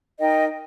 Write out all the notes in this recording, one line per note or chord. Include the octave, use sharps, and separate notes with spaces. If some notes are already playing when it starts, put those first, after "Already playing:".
D#4 A#4 D#5 G5